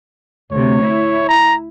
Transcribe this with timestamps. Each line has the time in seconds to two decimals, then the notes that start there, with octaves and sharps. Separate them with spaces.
0.52 D2 C3 C#5
0.81 E4
1.29 A#5